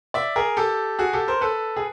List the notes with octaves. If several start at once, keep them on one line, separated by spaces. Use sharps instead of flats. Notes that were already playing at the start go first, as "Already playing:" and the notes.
D5 E5
G#4 A#4
G4 A4
F#4 G#4
G4 A4
A#4 C5
A4 B4
G#4